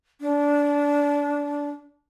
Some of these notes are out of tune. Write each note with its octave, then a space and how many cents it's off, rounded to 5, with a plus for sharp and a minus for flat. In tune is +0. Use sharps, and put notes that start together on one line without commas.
D4 -20